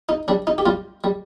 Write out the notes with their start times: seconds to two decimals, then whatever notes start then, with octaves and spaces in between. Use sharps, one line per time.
0.09 D#4
0.28 G3 D4
0.47 D#4
0.58 G4
0.66 G3 F4
1.04 G3